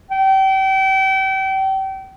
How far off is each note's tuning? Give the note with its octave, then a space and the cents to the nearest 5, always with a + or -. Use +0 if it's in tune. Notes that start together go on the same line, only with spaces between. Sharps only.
G5 -35